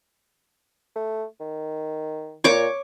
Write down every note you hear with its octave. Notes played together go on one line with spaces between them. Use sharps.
A3
D#3
A#2 C#5 C#6 D6